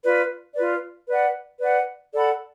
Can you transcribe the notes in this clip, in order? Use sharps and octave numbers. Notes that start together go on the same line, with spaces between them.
F4 B4 D5
F4 B4 D5
B4 D5 F#5
B4 D5 F#5
A4 D5 F#5 B5